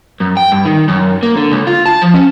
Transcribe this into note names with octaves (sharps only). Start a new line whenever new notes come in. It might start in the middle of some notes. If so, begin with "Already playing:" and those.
F#2
G5
G2
D#3
F#2
A#3
D3
C#2
F4
A5
F3
C#4